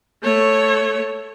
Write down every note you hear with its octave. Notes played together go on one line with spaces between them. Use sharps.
A3 C#5